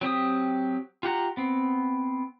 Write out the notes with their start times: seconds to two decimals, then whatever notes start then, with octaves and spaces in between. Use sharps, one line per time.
0.01 F#3 C4 G4 D#6
1.03 F4 G4 F#5 A#5
1.37 B3 C4